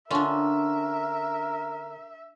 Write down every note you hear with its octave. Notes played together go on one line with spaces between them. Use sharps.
D3 C#4 D4 F4 A#4 E5